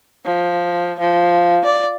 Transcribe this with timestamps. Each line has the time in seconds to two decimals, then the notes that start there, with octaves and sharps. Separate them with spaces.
0.25 F3
0.99 F3
1.65 D5